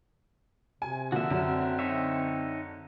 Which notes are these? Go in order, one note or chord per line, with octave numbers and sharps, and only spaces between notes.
C3 G#5
D3 F3 A#3 F#4 E5
F#2 D3 C4
D#4 C#5 E5